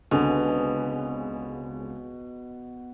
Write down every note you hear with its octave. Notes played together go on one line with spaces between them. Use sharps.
C#2 B2 D3 C4 G#5